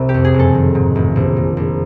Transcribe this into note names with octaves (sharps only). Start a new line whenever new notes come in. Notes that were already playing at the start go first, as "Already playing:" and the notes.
Already playing: C2 C3
G4
F2
G#4
F#1
A4
D#3
G#2
A1
A#1
A#2
A#1